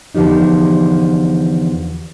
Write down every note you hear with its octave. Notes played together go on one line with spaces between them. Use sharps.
E2 D3 F3 G3 D#4